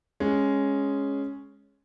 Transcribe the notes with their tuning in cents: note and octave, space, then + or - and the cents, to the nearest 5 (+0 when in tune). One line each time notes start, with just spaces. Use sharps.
G#3 +0 C#4 +0 G#4 +0